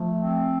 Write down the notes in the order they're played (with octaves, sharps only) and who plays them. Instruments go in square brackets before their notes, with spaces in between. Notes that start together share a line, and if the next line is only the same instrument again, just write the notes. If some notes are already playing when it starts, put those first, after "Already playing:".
Already playing: [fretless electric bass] F3 [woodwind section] A3
[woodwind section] C4